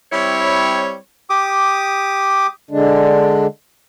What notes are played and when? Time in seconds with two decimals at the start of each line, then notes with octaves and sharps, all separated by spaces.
0.12 G3 C4 E4 C#5
1.30 G4 D6 D#6
2.71 D3 G#3 D4